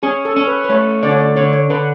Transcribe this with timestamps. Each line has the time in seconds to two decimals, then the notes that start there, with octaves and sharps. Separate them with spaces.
0.03 C#4 G#4
0.25 A4
0.36 C#4
0.47 B4
0.64 B4
0.69 A3 C#5
1.03 D3 D5
1.11 C#5
1.20 D5
1.36 D3 C#5
1.53 C#5
1.70 D3 B4